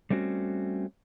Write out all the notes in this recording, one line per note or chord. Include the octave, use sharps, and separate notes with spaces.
G3 A3 C4 C#4 F#4